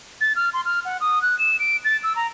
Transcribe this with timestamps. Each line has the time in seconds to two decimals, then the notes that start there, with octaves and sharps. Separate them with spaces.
0.21 A6
0.36 F6
0.53 C6
0.65 F6
0.85 F#5
1.01 D#6
1.22 F#6
1.39 E7
1.59 D7
1.85 A6
2.03 E6
2.16 A#5